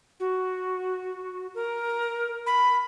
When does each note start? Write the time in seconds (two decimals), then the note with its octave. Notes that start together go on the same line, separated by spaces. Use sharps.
0.20 F#4
1.55 A#4
2.46 B5